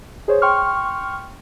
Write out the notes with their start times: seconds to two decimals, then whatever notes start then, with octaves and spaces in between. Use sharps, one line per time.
0.28 G#4 C5 C#5
0.42 G5 C6 C#6 F6